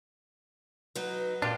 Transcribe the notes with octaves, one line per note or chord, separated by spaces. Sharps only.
F#3 D#4 B4
A#2 D4 F4 G4